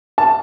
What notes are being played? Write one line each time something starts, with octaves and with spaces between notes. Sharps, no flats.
A5